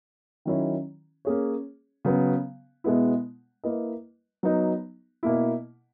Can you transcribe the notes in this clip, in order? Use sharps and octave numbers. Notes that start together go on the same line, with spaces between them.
D#3 F#3 C#4 E4
A#3 C#4 G#4 C#5
C#3 F#3 B3
B2 G#3 B3 E4
A#3 E4 B4 D#5
F#3 B3 D#4
B2 A#3 E4